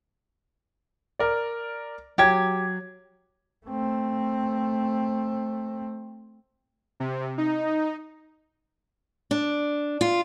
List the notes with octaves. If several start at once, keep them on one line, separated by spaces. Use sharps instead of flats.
A#4 D5
F#3 G4 G#6
A3 C4
C3
D#4
D4
F4